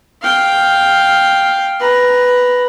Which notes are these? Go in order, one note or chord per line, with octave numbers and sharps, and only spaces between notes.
F5 G5
B4 A#5